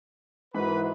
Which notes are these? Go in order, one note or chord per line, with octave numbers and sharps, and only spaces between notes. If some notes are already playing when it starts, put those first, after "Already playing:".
G#2 E3 F#4 A#4 B4 B5